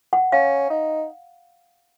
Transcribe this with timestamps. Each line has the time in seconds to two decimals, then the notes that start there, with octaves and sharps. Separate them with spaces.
0.13 F#5
0.32 C#4 F5
0.70 D#4